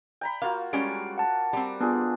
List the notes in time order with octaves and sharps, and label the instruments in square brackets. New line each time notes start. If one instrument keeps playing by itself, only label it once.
[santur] G5 A#5 B5
[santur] A#3 F4 F#4 [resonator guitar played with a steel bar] F5
[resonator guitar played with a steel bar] G3 G#3 C#4 [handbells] D7
[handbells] F#5 A5
[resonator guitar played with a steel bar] G3 C4
[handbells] B3 F4 [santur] D4 G#4